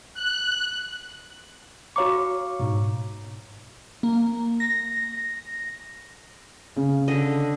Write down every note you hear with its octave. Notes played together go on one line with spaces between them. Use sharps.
F#6
F#4 C#5 F5 A#5 C#6 D6
G#2 B2
A#3
A#6
C#3
D3 D#5